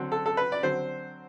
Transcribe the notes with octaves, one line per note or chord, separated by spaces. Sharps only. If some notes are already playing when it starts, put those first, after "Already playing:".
Already playing: D3 F#3 C4
A4
A4
B4
D5
D3 F#3 C4 C5